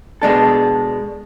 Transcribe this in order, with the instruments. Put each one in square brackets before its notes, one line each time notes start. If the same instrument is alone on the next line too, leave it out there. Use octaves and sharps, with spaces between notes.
[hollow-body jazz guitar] B2 G#3 D4 A4